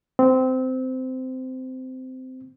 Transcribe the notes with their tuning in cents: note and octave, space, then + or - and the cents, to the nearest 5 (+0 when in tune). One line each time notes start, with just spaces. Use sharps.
C4 -20